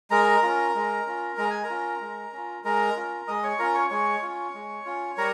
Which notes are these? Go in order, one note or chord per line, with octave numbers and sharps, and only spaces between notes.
G#3 A#4 A#5
C#4 F4
G#3
C#4 F4
G#3 A#5
G#5
A#4 A#5
C#4 F4
G#3
C#4 F4
G#3 A#4 A#5
C#4 F4
G#3 D#5 D#6
C#5 C#6
C#4 F4 A#4 A#5
C#5 C#6
G#3 C#5 C#6
C#4 F4
G#3
C#4 F4
G3 A#4 A#5